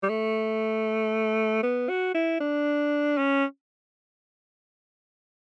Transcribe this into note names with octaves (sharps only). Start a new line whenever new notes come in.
G3
A3
B3
F#4
E4
D4
C#4